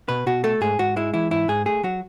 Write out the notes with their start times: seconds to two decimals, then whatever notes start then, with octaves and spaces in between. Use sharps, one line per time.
0.09 B2 B4
0.26 B2 F#4
0.44 A3 A4
0.61 G#2 G#4
0.79 G#2 F#4
0.96 G#3 E4
1.14 E3 E4
1.31 G#2 E4
1.48 G#2 G#4
1.66 A3 G#4
1.83 F#3 F#4